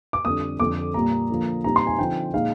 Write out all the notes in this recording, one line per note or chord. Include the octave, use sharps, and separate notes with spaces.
D6
F2 D3 G3 D4 D#6
F2 D3 F3 D6
A#2 G3 A#3 A#5
D3 F3 A#3
A#2 G3 C4 D#4 A#5
C6
G#5
D3 F3 C4 D#4 G5
A#2 G#3 D#4 F5